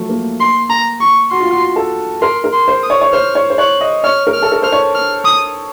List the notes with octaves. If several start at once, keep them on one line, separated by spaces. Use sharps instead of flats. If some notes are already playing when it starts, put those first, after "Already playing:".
Already playing: F3 F#3 A3
A#3
C6
A#5
C#6
F#4 C6
F4
F#4
A4
A#4 C6
A#4
C6
C5
D#6
C#5
C#5
C5 F6
C#5
C5
C#5 F#6
D#5
C#5 F6
A#4
F6
A4
A#4
C5 F6
C#5
F6
D#6